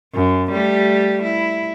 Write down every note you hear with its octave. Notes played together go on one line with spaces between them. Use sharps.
F#2
G3 A3 G4
E4